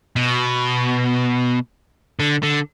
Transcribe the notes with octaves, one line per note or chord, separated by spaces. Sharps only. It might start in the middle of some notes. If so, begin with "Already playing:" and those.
B2
D3
D3